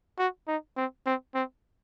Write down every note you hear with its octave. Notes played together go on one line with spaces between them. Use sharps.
F#4
D#4
C4
C4
C4